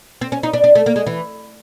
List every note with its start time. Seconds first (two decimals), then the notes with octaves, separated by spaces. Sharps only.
0.21 C4
0.32 C#4
0.43 D#4
0.53 D4
0.64 D4
0.75 A3
0.86 A#3
0.96 G#3
1.07 E3